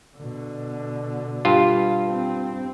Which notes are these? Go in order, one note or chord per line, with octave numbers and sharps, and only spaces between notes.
B2 D3
G2 F4
C4